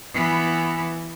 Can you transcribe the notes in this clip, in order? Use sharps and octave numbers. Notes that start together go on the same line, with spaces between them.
E3 B3